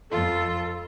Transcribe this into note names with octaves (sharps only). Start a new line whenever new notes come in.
F2 F4 A4